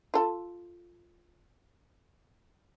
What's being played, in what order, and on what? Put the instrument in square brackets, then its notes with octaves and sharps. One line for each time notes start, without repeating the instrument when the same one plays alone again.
[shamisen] F4 A4